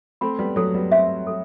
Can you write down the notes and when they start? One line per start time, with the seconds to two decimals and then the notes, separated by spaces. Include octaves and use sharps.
0.21 A3 C4 B5
0.39 G3 B3
0.56 F#3 A3 A4
0.74 G3 B3
0.91 A3 C4 E5
1.27 A4